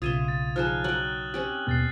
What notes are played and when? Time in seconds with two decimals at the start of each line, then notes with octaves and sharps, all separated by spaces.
0.02 B1 C#3 F4 E5 C6 D#6 G#6 D#7
0.25 A6 D#7
0.56 F3 D#4 G#4 F6 F#6 E7
0.84 F#3 G5 F#6 F#7
1.34 C4 C#4 G4
1.67 D#2 B2 B3 F#6 A6 C7